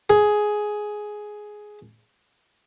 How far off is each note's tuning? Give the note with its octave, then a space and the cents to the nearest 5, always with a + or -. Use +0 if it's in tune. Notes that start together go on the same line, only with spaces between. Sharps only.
G#4 +10